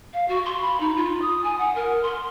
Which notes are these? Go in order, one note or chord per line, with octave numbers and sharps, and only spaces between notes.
F5
F#4
C6
B5
D#4
F4
D#6
G#5
F#5
A#4
C6